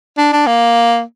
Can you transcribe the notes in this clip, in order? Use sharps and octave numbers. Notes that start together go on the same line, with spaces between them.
D4
D4
A#3